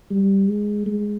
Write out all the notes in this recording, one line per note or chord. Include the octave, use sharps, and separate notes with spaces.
G3
G#3
G#3